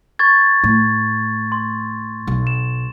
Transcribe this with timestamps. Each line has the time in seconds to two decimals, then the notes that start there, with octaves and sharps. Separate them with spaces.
0.19 C#6 G#6 A6
0.64 A2
1.52 C6
2.27 B1
2.47 E7